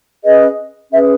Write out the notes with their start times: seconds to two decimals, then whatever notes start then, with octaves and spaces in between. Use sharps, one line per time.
0.23 C#4 G#4 B4 D#5
0.91 C#4 G#4 B4 E5